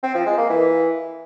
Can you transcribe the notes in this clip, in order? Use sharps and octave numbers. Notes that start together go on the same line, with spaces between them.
C4
F3
G#3
A#3
E3